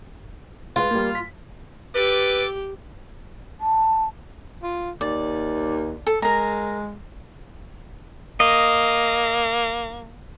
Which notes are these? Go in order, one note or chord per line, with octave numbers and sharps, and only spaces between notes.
G#3 F4 B4
G3 A#3
B6
G4 A4 B4 D6
A5
F4
D#2 D5
A4
G#3 A#4 A#5
A#3 D#5